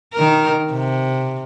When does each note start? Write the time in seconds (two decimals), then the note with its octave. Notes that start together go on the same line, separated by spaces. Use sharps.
0.14 D#3 A#4
0.71 C3